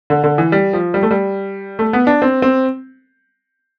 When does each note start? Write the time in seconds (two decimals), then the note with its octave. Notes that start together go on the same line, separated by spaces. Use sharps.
0.10 D3
0.24 D3
0.38 E3
0.52 G3
0.73 F3
0.94 G3
1.03 A3
1.11 G3
1.79 A3
1.93 B3
2.07 D4
2.22 C4
2.42 C4